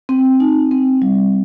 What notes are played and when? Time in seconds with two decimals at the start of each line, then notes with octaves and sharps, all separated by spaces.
0.09 C4
0.40 D#4
0.71 C4
1.02 G3